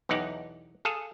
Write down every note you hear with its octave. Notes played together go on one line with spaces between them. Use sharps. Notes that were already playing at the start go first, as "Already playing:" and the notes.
B1 E2 E3 D#4 G4 F#5
G#4 A4 F5